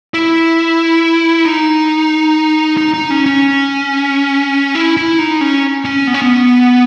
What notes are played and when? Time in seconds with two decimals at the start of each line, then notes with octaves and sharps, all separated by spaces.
0.14 E4
1.45 D#4
2.77 D#4
2.94 D#4
3.10 C#4
3.26 C#4
4.75 E4
4.97 E4
5.19 D#4
5.41 C#4
5.85 C#4
6.07 B3
6.14 C#4
6.22 B3